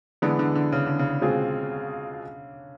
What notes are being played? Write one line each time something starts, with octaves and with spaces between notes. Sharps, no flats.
D3 E3 G#3 B3 D4
D3
D3
C#3
D3
C#3
B2 G#3 C4 F4 G#4